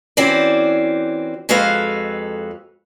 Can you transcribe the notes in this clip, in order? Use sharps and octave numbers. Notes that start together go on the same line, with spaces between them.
E3 C4 C#4 F#4 D5
F2 G#3 F#4 A4 B4 F5